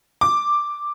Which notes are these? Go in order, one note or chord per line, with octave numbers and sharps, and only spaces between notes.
D6